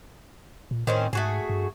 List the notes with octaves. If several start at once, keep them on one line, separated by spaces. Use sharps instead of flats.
A#2
A2 D#3 C4 C#4
G#2 A3 F#4 G#4
G2